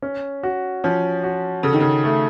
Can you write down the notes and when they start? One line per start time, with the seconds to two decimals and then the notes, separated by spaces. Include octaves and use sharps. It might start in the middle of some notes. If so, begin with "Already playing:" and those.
0.02 C#4
0.43 F#4
0.84 F3 C#4
1.24 F#4
1.63 C#3 A4
1.73 D#3
1.80 C#3
2.04 A3